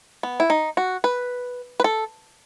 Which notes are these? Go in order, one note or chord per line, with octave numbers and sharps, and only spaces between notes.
B3
E4
D#4
F#4
B4
B4
A4